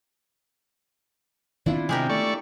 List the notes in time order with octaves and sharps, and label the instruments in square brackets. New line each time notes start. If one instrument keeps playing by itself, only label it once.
[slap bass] D#3 B3 C4 [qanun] D4 E4 F4
[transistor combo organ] C3 [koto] G#3 G4 A#4
[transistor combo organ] A3 D5 C#6